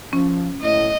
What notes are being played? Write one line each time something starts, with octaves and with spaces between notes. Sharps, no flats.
F3 C#4
A2 D#5